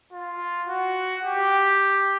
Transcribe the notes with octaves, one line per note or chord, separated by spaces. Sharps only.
F4
F#4
G4